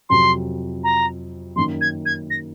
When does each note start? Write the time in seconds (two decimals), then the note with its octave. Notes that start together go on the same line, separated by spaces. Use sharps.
0.09 F2 C3 F#3 C6
0.84 A#5
1.56 F#2 D#3 A#3 C6
1.81 G#6
2.06 G#6
2.30 A#6